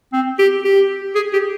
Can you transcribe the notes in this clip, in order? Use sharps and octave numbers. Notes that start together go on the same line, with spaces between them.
C4
G4
G4
G#4
G4